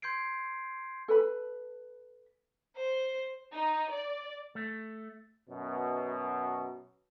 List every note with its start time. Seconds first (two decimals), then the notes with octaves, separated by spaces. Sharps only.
0.02 C6 G6 G#6 C7 D7
1.08 A4 B4 B5
2.76 C5
3.52 D#4
3.91 D5
4.55 A3
5.49 F#2 B2